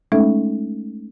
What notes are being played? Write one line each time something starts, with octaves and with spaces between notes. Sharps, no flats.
G#3 A3 C#4 D#4 A4 E5